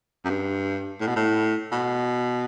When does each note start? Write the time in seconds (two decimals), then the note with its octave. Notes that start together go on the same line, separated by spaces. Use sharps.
0.24 F#2
0.30 G2
1.00 A2
1.07 B2
1.16 A2
1.72 B2